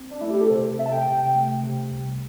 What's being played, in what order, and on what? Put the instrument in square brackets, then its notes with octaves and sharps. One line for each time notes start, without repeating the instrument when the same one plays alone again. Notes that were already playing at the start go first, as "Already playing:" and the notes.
Already playing: [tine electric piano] C4
[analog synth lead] D4
[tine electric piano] A3 [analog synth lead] E4
[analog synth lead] G4
A4
[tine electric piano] C3 [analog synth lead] C5
[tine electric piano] C4 [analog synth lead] E5
[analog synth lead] A5
G5
[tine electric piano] C3
A3
C3
C2